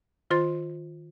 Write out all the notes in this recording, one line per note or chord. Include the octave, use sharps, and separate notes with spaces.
D#3 F4 C5 C6 A6